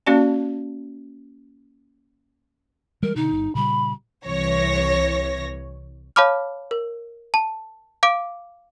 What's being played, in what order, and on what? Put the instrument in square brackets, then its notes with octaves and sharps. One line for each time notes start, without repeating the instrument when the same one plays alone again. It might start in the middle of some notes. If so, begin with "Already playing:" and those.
[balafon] A#3 C#4 F#4 D5 A5
[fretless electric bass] E3 G3 G#3 [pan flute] A#4
[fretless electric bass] B2 D3 [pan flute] D#4
[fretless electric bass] G1
[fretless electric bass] A#2 C#3 G3 [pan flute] B5
[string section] C2 E3 C#5 A#6
[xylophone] C#5 F5 A5 B5 D6 F6
A#4
A5
F5 D6 D7